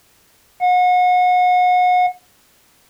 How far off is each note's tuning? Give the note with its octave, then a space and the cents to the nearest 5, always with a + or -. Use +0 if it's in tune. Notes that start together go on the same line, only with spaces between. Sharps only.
F#5 -35